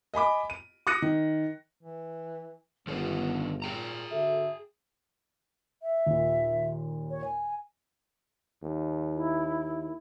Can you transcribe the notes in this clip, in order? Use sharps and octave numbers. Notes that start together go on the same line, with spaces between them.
D#5 G#5 B5 D6
D#7
D6 D#6 F#6 A#6 C#7 D#7
D#3
E3
G1 D#3 B3 D4 G#4
A#2 G#4 G5 A#5
D3 F#4 A4 E5
E5
D#2 A#2
C#5
G#5
D#2
E4